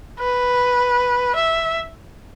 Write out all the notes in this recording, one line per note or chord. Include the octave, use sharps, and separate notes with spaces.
B4
E5